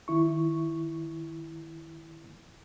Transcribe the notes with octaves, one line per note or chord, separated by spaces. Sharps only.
D#3 E4 C#6